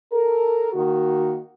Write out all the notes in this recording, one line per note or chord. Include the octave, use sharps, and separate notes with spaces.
A4 A#4
D#3 A#3 F#4